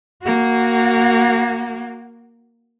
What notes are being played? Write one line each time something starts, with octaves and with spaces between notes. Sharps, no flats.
A#3 F#4